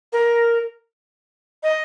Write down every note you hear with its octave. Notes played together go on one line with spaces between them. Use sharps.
A#4
D#5